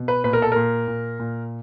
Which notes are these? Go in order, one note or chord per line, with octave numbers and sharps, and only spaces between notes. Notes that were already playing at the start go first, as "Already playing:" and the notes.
Already playing: B2
B4
A#2 B4
A#4
A4
A#2 A#4
A#2
A#2